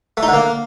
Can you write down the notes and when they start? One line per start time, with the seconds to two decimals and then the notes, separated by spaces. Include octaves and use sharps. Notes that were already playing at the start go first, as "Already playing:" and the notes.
0.17 A3
0.23 D#4
0.28 D3
0.33 A#3